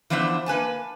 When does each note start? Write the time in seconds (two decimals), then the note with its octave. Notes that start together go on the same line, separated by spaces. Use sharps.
0.10 E3 F3 B3 D4 C5 E5
0.46 A#3 B4 G#5 A5